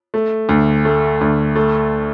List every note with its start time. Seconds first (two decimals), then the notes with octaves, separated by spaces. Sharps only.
0.14 A3
0.49 D2
0.85 A3
1.21 D2
1.56 A3